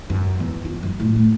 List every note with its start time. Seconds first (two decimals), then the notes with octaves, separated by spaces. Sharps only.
0.10 F#2
0.40 E2
0.65 F4
0.83 F#2
1.00 A2
1.16 A3